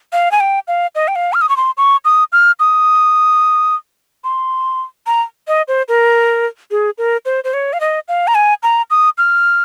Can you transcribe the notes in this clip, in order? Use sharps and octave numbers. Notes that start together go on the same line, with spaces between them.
F5
G#5
G5
F5
D#5
G5
F5
F6
D#6
C#6
C6
C#6
D#6
F6
D#6
C6
A#5
D#5
C5
A#4
G#4
A#4
C5
C5
C#5
F5
D#5
F5
A#5
G#5
A#5
D#6
F6